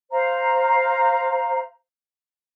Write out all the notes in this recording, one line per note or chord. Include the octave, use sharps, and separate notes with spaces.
C5 F5 A#5